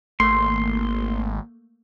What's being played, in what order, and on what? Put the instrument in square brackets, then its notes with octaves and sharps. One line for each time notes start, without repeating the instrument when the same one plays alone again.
[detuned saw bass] G#1 [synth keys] A3 A#3 [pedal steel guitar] C6